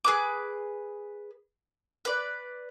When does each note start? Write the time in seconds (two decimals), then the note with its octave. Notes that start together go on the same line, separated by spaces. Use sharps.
0.04 G#4 B4 D6
2.05 B4 D5